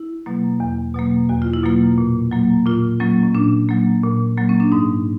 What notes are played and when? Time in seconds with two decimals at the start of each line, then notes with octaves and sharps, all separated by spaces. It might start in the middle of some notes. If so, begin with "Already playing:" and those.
Already playing: E4
0.26 B2 F#3 A#3
0.60 E2
0.94 B2 F#3 A#3
1.29 E2 F#4
1.42 F4
1.53 E4
1.63 B2 F#3 A#3 F4
1.98 A#2
2.32 F#3 A#3
2.66 A#2 F4
3.00 F#3 A#3 C#4
3.23 C#4
3.35 A#2 D4
3.69 F#3 A#3
4.03 A#2
4.37 F#3 A#3
4.49 C#4
4.60 D4
4.72 G#2 D#4